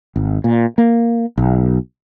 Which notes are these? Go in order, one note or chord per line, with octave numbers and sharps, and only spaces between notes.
G#1
A#2
A#3
B1